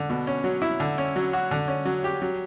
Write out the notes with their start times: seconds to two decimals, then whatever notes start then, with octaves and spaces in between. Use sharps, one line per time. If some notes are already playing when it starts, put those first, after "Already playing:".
Already playing: D3
0.10 B2
0.27 C#4
0.44 F#3
0.62 E4
0.80 D3
0.98 C#4
1.16 F#3
1.33 F#4
1.51 D3
1.68 C#4
1.85 F#3
2.04 G4
2.22 F#3